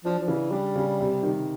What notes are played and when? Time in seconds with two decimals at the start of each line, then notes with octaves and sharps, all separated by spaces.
0.05 F3 D4
0.19 F3
0.28 C#3 E3
0.51 G3 D4
0.76 C#3
1.00 C3
1.23 D#3